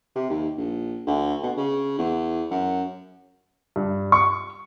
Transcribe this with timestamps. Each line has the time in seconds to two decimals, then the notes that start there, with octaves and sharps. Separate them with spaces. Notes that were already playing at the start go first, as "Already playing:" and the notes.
0.16 C3
0.30 D#2
0.58 A#1
1.07 D2
1.43 B2
1.57 C#3
1.98 E2
2.51 F#2
3.76 G2
4.12 C#6